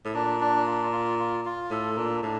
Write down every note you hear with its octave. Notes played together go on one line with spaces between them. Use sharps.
A2
A#2 D4
D4
F4
F4
F4
F4
A2 A4
A#2 D4
A2 D4